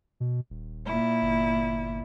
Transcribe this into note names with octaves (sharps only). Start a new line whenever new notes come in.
B2
D#1
A#2 E4
G1